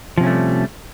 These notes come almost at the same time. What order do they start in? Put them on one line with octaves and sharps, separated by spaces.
F3 C3 C#4 A3 G3